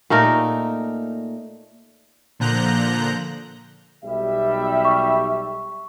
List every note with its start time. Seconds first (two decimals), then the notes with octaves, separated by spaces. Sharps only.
0.10 A#2 A3 D#4 A#4
2.39 A#2 D3 F3 A#5 F#6 G6
4.04 B1 G3 E5
4.85 C#6